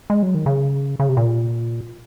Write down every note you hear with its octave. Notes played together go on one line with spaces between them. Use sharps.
G#3
F#3
D#3
C#3
C#3
C3
A#2